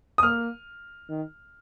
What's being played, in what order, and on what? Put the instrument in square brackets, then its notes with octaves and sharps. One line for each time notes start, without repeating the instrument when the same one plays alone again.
[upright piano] D#6
[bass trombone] A#3 [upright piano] F6
[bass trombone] D#3